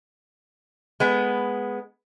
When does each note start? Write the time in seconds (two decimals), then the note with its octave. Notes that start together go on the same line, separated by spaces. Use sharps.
1.00 G#3 B3